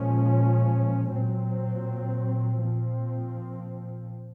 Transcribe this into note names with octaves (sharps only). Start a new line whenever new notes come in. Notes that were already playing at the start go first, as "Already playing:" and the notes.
Already playing: A#2 F3 G#3 C#4
A#2 F#3 C4
A#2 F3 C4